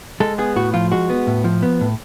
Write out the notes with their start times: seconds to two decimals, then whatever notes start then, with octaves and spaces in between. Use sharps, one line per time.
0.20 G#3 A4
0.38 B3 G#4
0.56 A2 F#4
0.74 F3 F4
0.92 G#3 F#4
1.09 B3
1.27 A2
1.44 F3
1.63 B3
1.81 A2